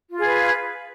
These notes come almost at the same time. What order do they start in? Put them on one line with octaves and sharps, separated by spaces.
F4 F5 G#4 B4